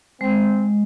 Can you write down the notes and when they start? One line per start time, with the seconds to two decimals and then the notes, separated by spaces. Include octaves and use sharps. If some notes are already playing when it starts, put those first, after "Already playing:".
0.21 G#3 C4